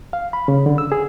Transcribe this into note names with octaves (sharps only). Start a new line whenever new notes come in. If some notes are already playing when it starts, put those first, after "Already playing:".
F5
B5
C#3
D3
E6
G#4